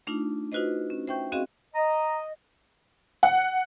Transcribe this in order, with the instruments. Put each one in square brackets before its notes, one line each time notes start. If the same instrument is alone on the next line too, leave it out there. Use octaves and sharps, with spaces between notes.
[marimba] A3 D4 D#4 F4
D#4 F4 F#4 B4 C5 D#5
C#4
C5 E5 G5 C#6 G6
C4 C#4 F#4 G#4 D#5 F5
[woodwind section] D#5 [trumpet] A#5
[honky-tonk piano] F#5